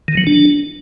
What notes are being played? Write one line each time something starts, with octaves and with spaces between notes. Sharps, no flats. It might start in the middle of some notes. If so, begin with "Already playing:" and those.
D#3
F#3
D4